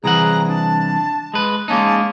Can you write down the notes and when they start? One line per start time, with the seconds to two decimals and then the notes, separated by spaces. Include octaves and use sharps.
0.04 C2 E3 G#4 F#5 A#5
0.49 D4 A5
1.34 G#3 B4
1.68 G#3 A#3 C#4 D#4 A5